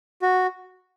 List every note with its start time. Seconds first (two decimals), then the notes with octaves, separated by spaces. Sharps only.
0.22 F#4